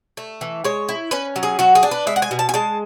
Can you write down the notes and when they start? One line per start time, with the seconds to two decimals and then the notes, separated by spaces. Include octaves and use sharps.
0.17 A3
0.41 E3
0.64 G#3 C#5
0.89 E4
1.11 C#4 B4
1.36 F#3
1.43 G#4
1.59 F#3 F#4
1.75 G#4
1.83 D4
1.91 B4
2.07 G#3 E5
2.16 F#5
2.22 G#5
2.31 B2
2.39 A5
2.49 G#5
2.54 G#3 A5